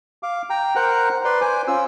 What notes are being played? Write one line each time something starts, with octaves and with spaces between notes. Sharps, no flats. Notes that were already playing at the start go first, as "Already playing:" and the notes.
F5 D6
G5 A#5
A#4 C5 F#5 A#5 F#6
B4 D5 C6
C5 G#5 D6
C#4 F4 E6